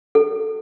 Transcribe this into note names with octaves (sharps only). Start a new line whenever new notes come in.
A4